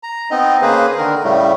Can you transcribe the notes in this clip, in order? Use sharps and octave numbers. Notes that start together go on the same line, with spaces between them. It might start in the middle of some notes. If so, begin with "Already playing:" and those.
A#5
B3 C4 D#4 D#5
C#3 A#3 G#4 B4 C5
D3 D#3 A#4
A2 C#3 G3 A3